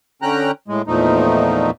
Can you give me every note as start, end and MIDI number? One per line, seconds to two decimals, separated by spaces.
0.22 0.51 50
0.22 0.51 61
0.22 0.51 79
0.22 0.51 82
0.22 0.51 90
0.68 0.82 45
0.68 0.82 56
0.87 1.71 40
0.87 1.71 46
0.87 1.71 53
0.87 1.71 57
0.87 1.71 63